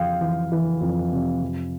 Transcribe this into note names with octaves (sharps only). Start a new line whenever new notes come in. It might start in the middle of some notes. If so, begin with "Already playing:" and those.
Already playing: F2 E3 F5 G5
E3
E3
F2
C3
F2